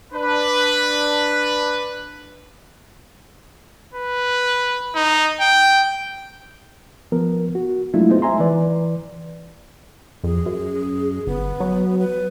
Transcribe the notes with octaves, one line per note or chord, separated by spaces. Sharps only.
D4 B4
B4
D#4
G5
F3 B3 A#4
F#4
F#3 G#3 A3 D4 E4 F4
B3 D#4 F4 G#4 C5
E5 G#5 A#5 C6
E3 B4 D5
F2 G#4
F#2
G1 B3
F#3
B4